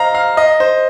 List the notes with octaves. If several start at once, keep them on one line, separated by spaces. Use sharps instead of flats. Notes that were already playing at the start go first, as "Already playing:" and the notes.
Already playing: C5 D#5 F5 A#5
F5
D#5
C5